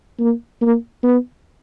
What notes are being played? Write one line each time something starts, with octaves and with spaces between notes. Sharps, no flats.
A#3
A#3
B3